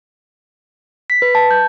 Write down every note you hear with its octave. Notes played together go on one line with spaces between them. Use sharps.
B6
B4
A5
G6